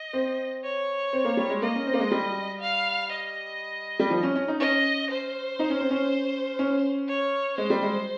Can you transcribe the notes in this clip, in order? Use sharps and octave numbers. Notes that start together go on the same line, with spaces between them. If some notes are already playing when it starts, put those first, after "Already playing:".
Already playing: D#5
C4
C#5
C4
A#3
G3
G#3
A#3 D#5
C#4
C4
A#3
G#3
G3
F5
D#5
G3
F3
C#4
C#4
D#4
C#4 D#5
C5
D#4
C#4
C4
C#4
C#4
C#5
G#3 C5
G3
G#3